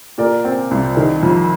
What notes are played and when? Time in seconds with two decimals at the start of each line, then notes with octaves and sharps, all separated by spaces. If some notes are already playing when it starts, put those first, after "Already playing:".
0.18 A#2 A#4 D5
0.44 C4
0.71 C2
0.97 D#3
1.23 F2